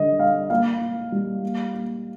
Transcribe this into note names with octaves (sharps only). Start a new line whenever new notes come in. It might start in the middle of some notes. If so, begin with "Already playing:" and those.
Already playing: D3 G3 D#5
G3 F5
A#3 F5
A#3
G3
A#3
A#3